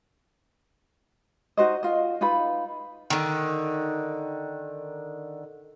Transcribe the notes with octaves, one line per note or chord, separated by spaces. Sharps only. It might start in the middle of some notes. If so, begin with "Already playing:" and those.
D#4 F#4 C5 D#5
F4 D#5
D#4 F4 B4 B5
D3 D#3